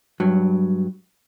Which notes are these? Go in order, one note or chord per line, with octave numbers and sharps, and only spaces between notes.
G2 F#3